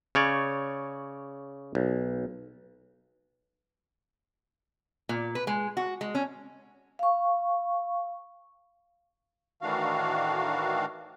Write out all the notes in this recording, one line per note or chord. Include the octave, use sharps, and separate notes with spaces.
C#3 C#5 D5
B1
A#2
B4
G#3
F#4
G#3
C#4
F5 C#6
A2 D#3 E3 D4 F#4 F5